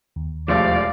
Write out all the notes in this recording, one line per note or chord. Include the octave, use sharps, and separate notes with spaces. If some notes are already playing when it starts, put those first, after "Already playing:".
D#2
E1 F3 A3 G4 D5 F5